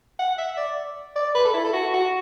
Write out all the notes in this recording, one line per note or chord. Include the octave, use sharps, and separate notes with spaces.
F#5
E5
D5
D5
B4
A4
E4
A4
F#4
F#4